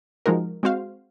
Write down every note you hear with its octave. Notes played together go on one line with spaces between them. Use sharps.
F3 G#3 D#4 F#4 A#4
G#3 C4 F#4 C5 F5